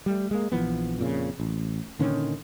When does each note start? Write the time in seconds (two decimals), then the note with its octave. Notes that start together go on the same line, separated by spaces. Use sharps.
0.06 G3 A3
0.31 G#3 A#3
0.52 A#1 E3 F3 B3
0.99 F2 A#2 C#3
1.40 A1
1.99 A#2 D3 D#3 C#4